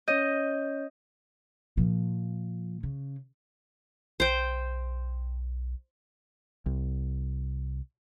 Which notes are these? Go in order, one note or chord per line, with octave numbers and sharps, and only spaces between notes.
C#4 C#5 D#5 G6
A#2 F3
C#3
B1 C5 G5
C2